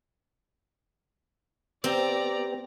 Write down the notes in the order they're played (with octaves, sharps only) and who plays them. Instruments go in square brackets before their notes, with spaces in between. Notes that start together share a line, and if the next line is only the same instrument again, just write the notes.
[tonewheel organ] B3 G4 [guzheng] C4 [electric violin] D5 A#5